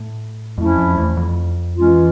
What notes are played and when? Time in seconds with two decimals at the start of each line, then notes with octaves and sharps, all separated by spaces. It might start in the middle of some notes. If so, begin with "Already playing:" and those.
Already playing: A2
0.58 F2 F3 A3 C#4 E4
0.78 F2
0.97 E2
1.17 F2
1.77 E3 G#3 C#4 F4